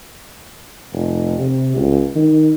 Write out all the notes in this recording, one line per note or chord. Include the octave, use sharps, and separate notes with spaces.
F1
C3
C#2
D#3